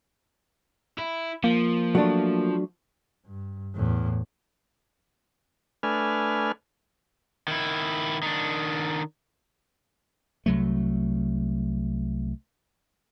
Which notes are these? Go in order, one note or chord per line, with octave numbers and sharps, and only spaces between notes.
E4
F3 A#3
F#3 A3 D4
G2
E2 A2
A3 D4 B4 G#5 F6
D#3 E4
D#3 D4
C2 F#3 A3